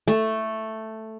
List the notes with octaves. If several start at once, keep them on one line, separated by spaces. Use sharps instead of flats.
A3